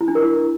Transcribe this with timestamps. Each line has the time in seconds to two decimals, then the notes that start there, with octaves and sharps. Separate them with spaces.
0.01 E4
0.08 D4
0.15 A#4
0.22 E4